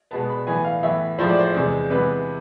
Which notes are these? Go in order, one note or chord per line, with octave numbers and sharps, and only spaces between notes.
B2 G#3 B3 A5
B5
A2 E3 B3 G#5
F5
A2 E3 B3 E5
A2 F3 G#3 C5
D5
C5
E2 C3 G#3
C3 E3 G#3 B3 B4